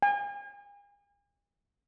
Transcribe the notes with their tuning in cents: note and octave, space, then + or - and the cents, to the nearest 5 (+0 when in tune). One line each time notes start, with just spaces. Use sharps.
G#5 -40